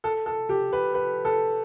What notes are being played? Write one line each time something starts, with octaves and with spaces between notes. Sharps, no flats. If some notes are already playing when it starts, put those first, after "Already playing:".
A4
A4
G4
B4
B4
A4